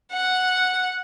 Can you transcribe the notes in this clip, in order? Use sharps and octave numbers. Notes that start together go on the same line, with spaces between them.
F#5